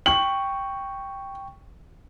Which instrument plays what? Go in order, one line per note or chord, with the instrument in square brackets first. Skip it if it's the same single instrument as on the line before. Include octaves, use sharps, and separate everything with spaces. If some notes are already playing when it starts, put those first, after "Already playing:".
[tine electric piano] G5 C#6 [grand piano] F#7